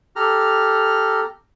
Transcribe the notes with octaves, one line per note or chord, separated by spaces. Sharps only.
G4 A4 A#5 F6